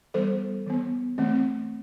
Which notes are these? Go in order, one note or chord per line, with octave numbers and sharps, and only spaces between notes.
E3 G3 B3 A4 C5
E3 B3
E3 A3 C4